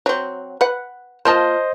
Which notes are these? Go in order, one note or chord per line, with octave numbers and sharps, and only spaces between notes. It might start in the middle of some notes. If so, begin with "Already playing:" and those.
F#3 C4
B4 F#5
A#3 F4 C5 D#5 A5